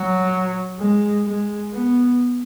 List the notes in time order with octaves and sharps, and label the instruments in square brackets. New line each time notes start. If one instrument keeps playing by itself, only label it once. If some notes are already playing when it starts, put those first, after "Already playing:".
Already playing: [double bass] F#3
G#3
G#3
B3